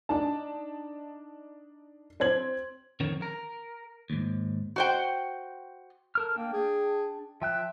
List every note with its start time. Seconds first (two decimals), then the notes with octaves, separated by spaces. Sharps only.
0.09 D4 D#4 A5
2.20 C4 C5 G#6 F#7
3.00 F2 D3 D#3 C4 A#4 C#5
3.22 A#4
4.10 D#2 G#2
4.76 F#4 C5 G5
6.15 A4 A#4 F6
6.36 A#3 D4 G5
6.53 G#4
7.42 F3 E5 G5 F#6